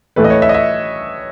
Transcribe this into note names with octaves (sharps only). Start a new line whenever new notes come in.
A2 E3 A3 B4
D#5
C#5
E5
D#5
E5